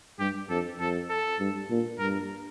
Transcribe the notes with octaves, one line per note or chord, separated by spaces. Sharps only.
G2 G4
F2 A4
F2 A4
A4
G2
A#2
G2 A#4